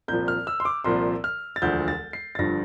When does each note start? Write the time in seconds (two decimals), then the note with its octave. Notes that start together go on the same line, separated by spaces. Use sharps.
0.08 C2 A#2 F3 G6
0.28 F6
0.47 E6
0.60 C6
0.65 D6
0.84 C2 A#2 F3 C6
1.24 F6
1.56 A6
1.62 E1 D2 D3 F3 G6
1.88 A6
2.13 C7
2.35 A6
2.38 G1 G2 F3 A#6